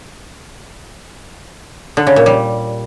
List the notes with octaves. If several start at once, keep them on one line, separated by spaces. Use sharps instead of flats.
D3
C#3
A#2
G3